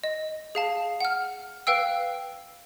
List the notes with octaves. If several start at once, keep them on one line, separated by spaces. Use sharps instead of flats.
D#5
G#4 F5 A5
F#5 F6
B4 F5 G5 E6